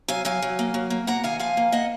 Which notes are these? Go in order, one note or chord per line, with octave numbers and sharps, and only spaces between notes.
F#3 F5 G#5
F#3 F5 G#5
F#3
A#3
F#3
A#3
A#3 F#5 A#5
D#3 F5 G#5
F3 F5 G#5
A#3
A#3 D#5 F#5